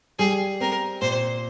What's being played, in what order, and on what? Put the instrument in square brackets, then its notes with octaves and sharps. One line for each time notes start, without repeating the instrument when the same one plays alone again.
[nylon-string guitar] G3 [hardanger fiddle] G#4
[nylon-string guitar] C4 [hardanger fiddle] A#4
[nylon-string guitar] A#2 [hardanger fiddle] C5